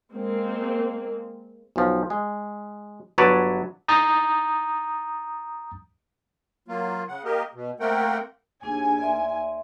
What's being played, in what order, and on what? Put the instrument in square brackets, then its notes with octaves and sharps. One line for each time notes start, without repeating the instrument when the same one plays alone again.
[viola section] G#3 A#3 C4
[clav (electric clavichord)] B1 F3
G#3
G1 F#3 B4 C#5 D5 A5
[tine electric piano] A#5 D#6 G6 A6
[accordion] F#3 A#3 F4
C#3 F#5
A#3 G4 A#4 D#5
B2
A3 A#3 C4 A#4 F#5 G5
[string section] D#2 G#5 [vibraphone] D4 G#4
[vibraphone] D5 E5 C6